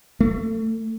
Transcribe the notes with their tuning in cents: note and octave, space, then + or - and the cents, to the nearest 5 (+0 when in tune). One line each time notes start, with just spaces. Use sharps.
A3 +25